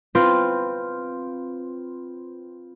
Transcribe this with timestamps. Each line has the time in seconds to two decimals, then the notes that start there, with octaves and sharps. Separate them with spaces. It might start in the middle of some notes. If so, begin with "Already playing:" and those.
0.15 C4 F4 B4